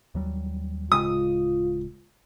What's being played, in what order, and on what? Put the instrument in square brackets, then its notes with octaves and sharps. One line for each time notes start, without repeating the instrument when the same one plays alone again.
[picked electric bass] D#2 F#3 G3
[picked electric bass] D1 C#3 G#3 [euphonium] F4 [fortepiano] D#6